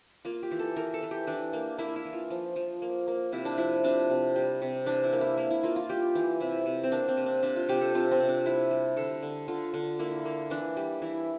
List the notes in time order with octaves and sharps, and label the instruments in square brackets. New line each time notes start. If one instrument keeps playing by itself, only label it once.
[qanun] A#3 F4
G4
E3
A4
E3 A#4
A4
E3
G4
E3 D4
A#3
A#3 E4
E4
E3
F4
F3
F3
A#3
A#3
C3 E4
D4
F3 E4
C3 D4
C3
G3
C3
E3 D4
E4
A#3
E4
A#3 E4
E4
A#3 F4
F4
G3 G4
E3
C3 E4
C3
C4
A#3 D4
C4
C3
D4
C3 D4
F4
C3 G4
A4
C3 F4
C4
C3
D4
G3 E4
G3
D3 A4
D3
D3 F4
D3
A#3 E4
A#3
E3 D4
G3
E3 E4